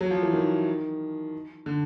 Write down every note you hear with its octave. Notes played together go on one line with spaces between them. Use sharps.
F#3
F3
E3
D#3
D3